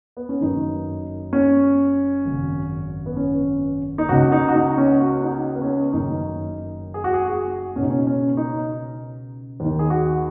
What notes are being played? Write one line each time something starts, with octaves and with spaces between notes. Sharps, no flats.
B3
C#4
F#1 F#2 D#3 D#4
C#4
G#1 F#2 C#3
B3
C#4
D#4
C#2 C#3 F#4
D#4
F#4
D#4
C#4
F#4
D#4
F#4
B3
C#4
F#1 F#2 D#3 D#4
G#4
F#4
G#4
F#4
C#2 B2 C#4
D#4
C#4
C#4
D#4
D#2 D#3
G#4
F#4